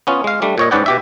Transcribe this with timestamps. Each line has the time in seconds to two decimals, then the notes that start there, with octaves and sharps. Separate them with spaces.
0.07 B3 C#4 F4
0.24 G#3 F5
0.42 G3 A3 D4
0.58 A#2 C#5 D#5
0.71 G#2 C#4 B4 D5 F#5 G5
0.86 B2 G4 E5